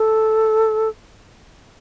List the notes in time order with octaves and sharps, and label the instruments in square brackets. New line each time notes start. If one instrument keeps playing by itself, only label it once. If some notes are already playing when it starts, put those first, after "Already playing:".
Already playing: [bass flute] A4